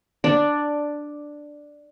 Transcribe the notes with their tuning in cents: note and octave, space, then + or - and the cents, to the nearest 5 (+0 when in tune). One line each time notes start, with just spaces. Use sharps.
D4 +5 D5 +0